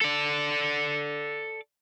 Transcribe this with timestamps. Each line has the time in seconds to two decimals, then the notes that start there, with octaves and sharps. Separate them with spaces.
0.01 A4 D5